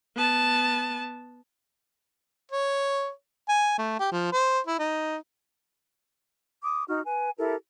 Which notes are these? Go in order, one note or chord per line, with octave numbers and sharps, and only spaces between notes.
B3 A5
C#5
G#5
A3
G4
F3
C5
E4
D#4
D6 D#6
D#4 F#4 F6
B4 G#5
E4 G4 A4 A#4